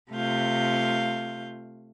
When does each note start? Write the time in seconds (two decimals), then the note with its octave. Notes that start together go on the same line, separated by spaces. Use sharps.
0.11 C3 A3 F4 F5 G6